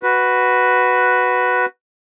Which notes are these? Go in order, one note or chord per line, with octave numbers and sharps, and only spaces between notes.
F#4 B4